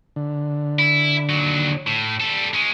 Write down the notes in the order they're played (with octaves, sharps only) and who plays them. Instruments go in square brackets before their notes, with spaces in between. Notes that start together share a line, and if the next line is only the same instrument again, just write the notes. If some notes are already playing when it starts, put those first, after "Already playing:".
[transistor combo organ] D3
[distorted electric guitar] E4
D#2 F#3
A2
G3 A4
G#3 C#4